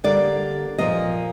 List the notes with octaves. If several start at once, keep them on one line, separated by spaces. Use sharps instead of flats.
D3 G3 A#3 D5
A#2 F3 A#3 D#5